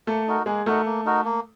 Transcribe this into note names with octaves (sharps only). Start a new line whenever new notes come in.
A3 A#3 A4
D#4 F#4 A#4
G#3 A#3 G#4
A3 D#4 F#4 A4 A#4
A#3
D#4 F#4 A#4
A#3